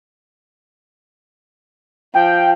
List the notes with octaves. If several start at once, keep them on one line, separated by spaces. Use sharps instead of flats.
F3 G5